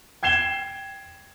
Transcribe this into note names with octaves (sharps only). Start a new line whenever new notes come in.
G5 G#6 C7 E7 G7